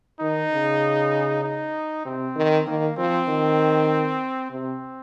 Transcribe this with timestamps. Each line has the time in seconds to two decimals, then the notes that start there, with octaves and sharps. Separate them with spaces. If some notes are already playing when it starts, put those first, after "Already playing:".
0.20 D#3 D#4
0.52 C#3
1.43 D#4
2.05 C3 C4
2.36 D#3
2.67 D#3 A#3
2.97 F3 C4
3.28 D#3
4.51 C3 C4